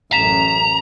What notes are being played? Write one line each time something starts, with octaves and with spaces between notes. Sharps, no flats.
A1 F#2 A#5 B6 E7 F7